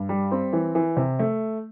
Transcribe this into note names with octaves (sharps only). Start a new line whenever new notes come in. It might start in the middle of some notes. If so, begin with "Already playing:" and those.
Already playing: G2
G3
C4
E3
E3
C3
A3